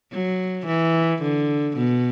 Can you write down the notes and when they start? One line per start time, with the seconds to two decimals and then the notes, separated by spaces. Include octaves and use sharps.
0.12 F#3
0.67 E3
1.22 D3
1.77 B2